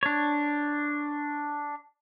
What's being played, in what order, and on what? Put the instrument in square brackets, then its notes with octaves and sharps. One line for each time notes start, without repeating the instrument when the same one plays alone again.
[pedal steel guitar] D4 C#5